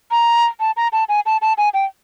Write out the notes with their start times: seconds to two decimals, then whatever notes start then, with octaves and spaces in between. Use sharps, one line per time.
0.11 A#5
0.60 A5
0.77 A#5
0.93 A5
1.09 G#5
1.26 A5
1.42 A5
1.58 G#5
1.74 G5